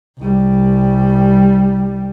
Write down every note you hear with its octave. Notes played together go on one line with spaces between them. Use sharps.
C2 G3